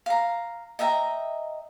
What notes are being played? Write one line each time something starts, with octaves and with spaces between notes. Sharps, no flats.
F5 A#5
D#5 E5 G5 A#5